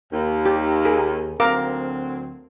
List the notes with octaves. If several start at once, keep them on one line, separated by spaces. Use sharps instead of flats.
D#2
G4
G#4 A#4
D2 F#3 C4 A#4 F5 D6